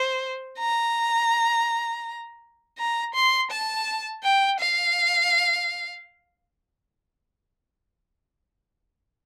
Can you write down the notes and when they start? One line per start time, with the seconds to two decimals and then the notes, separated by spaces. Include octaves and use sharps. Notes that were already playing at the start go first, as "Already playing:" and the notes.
Already playing: C5
0.59 A#5
2.78 A#5
3.15 C6
3.51 A5
4.24 G5
4.60 F5